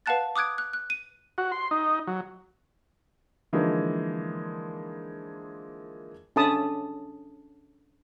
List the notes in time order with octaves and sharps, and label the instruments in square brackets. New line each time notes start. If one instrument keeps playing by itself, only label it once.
[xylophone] B4 F5 F#5 A5 F#6 A6
D6 D#6 F#6 G#6 D7
F#6
F#6
D#7
[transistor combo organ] F#4
C6
D#4
F#3
[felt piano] D3 E3 F3 G#3 A#3 D#4
[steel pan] C#4 D4 A4 A5 B5 D#6